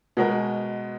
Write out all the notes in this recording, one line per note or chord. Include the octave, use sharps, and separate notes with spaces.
B2 G#3 B3 F#4 A#4